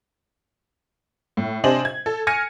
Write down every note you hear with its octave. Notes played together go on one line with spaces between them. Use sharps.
A2
C3 D4 C5 D#5 G#5 F#7
G#6
A4
G#5 F6 G#6 A#6 C#7 D#7